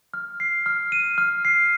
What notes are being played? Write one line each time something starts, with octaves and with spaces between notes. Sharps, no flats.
F6
C7
F6
D#7
F6
C7